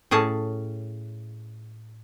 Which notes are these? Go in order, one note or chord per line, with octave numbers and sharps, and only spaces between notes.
A2 C#4 G#4 A5